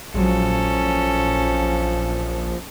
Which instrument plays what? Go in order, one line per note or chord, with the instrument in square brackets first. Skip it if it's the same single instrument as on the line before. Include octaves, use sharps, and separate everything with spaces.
[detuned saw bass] A#1 [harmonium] F3 [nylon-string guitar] F#3 G#3 [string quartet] C#4 A4